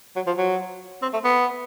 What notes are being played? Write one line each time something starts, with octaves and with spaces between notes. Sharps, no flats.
F#3
F3
F#3
C4
A3
B3